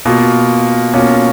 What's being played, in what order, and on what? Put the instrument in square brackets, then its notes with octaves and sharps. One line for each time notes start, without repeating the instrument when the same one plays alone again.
[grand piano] B2 A#3 F4
B2 A#3 C#4 F4